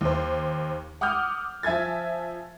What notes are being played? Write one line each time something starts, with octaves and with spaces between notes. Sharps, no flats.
D#2 C5
F#5 D6 D#6 F6 G6
F3 E5 G#5 G#6 A6